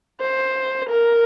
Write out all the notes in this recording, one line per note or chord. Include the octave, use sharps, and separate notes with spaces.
C5
A#4